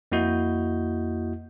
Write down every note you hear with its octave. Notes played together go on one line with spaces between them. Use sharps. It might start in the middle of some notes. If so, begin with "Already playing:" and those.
F2 A#3 E4 F#4 D#5 G6